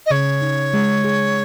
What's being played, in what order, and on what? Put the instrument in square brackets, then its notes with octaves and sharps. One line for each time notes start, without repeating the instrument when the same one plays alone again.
[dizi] D#5
[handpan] C#3 [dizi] C#5
[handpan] D#4
G#3
G#4